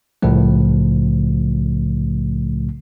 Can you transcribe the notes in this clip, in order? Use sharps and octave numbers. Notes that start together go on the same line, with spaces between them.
C2 A2 C#3 F3 A3